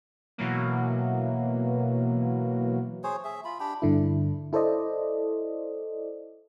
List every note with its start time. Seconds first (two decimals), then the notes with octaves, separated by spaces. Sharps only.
0.38 B2 E3 F#3 A#3
3.04 G#4 C5 C#5
3.24 G#4 E5
3.45 F4 B5
3.60 D4 G4 G5 B5
3.82 G2 D3 E4
4.53 E4 A4 C5 D5 D#5